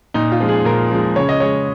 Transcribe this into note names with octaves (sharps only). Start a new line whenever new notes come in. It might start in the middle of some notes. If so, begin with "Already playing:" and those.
A#2 D#4
F4
F3 G#3
G#4
A#2 A#4
F3 G#3
C#3 C#5
D#5
G#3 C#5